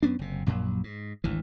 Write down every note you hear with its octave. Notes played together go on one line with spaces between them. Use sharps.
F#2 B3 C#4 D4
F#1 C3
A#1 F#2 A#2 F#3
G#2
G#1 D2 E3